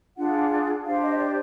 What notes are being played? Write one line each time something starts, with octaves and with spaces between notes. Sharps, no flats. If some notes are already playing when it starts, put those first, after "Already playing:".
D4 F4 G#4 F#5
D4 G4 C5 F5
D#5
D5